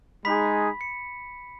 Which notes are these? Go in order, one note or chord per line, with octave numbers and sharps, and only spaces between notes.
G#3 D#4 G#4 B5 B6
C#7